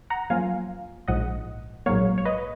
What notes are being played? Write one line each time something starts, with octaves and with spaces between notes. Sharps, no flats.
F#5 A#5
F#2 F3 A#3 F4 F5 G#5
A#1 G#2 F3 D#5 F#5
A#1 G#2 F#3 A#3 C#5 F5
C#5
B4 D#5